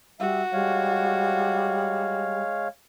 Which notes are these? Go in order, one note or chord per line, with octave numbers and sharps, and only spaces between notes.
G3 F#4 E5
G3 G#3 C#5 F5